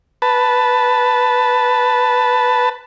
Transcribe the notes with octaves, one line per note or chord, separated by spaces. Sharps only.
B4 A5